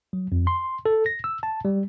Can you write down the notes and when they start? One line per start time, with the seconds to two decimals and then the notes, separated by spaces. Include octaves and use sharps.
0.13 F#3
0.32 F2
0.47 C6
0.86 A4
1.06 A#6
1.24 E6
1.43 A5
1.65 G3